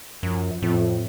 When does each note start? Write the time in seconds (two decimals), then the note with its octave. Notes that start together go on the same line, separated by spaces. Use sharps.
0.23 F#2 F3
0.62 F2 A2